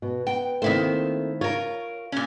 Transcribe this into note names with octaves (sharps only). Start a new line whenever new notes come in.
B2
B3 G5
D#3 A3 A#3 C4 E4 C5
F4 A#4 C#5
A#2 C#4